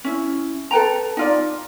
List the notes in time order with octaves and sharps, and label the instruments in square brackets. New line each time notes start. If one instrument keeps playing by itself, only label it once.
[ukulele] C#4 E4
A4 B4 G5 A#5
D#4 F4 D5